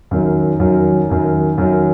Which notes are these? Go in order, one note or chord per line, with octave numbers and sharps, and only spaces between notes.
F#2 D#3 F#3
F#2 D#3 F#3
F#2 D#3 F#3
F#2 D#3 F#3